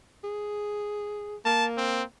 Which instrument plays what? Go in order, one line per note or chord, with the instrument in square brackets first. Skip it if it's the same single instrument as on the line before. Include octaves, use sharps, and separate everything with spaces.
[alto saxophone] G#4
[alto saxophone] A#3 [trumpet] A5
[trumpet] C4